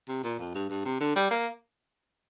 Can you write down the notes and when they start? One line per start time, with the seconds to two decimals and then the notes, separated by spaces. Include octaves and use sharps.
0.08 C3
0.24 A#2
0.39 F2
0.55 G2
0.70 G2
0.85 C3
1.00 D3
1.16 G3
1.31 A#3